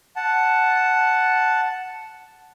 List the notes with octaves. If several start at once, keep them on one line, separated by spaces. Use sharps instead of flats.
F#5 A5